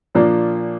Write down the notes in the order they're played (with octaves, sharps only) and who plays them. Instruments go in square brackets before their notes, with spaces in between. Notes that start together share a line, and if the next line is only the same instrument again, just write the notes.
[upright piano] A#2 F3 A#3 D4